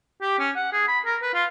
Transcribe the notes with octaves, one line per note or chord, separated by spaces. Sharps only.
G4
C#4
F#5
G#4
B5
A#4
B4
F4